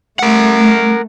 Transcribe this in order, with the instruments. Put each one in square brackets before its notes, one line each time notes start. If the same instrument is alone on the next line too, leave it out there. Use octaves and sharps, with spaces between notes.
[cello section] A3 [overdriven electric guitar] A#4 F#5